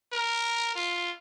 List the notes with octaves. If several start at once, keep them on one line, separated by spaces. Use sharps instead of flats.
A#4
F4